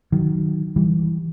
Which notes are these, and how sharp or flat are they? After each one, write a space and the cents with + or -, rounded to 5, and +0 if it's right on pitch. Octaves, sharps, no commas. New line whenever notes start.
D#3 +0 F#3 +0
E3 -5 G3 +0